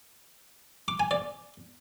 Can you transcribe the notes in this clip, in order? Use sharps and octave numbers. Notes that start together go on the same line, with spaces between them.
D6
G#5
D5